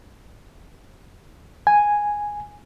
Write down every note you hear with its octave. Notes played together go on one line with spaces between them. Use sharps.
G#5